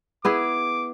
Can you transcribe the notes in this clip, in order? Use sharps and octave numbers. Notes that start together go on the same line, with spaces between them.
B3 E4 G#4 D6